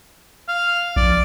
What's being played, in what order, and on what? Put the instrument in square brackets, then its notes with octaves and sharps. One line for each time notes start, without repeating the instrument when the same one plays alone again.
[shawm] F5
[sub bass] A#1 [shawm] D5